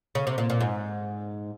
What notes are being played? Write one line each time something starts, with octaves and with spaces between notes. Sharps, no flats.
C#3
C3
A#2
A#2
G#2